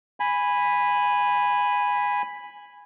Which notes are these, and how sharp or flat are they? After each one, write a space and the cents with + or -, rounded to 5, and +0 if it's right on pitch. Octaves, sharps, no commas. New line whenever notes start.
G#5 -10 B5 +0